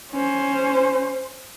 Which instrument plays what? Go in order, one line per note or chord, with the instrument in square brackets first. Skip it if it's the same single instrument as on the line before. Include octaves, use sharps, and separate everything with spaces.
[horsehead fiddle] C#4 C5